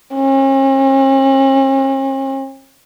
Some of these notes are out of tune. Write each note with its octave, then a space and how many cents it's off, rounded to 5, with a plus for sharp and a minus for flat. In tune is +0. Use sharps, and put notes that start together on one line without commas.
C#4 -45